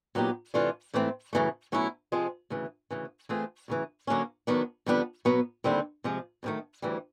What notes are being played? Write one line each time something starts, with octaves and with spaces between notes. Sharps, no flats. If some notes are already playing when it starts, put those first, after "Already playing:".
A#2 F#3 B3 D#4 G4
C3 E3 A3 D4 F4
G#2 E3 A3 C4
F#2 C#3 E3 A3
B2 F#3 A3 C#4 E4
C3 F3 G#3 C4
D2 C#3 E3
D2 C#3 E3
E3 A3 C4 F4 G#4
D2 C#3 E3
D3 F#3 A#3 C#4
D#3 F#3 B3 D4
F2 D3 G3 B3 D4
B2 F#3 B3
D#2 D3 G3 C4 E4
C3 F3 G#3
D2 C3 D#3 F#3 A3
D2 C#3 E3 G3